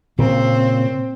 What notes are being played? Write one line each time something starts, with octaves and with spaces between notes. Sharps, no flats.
A#2 C#3 C4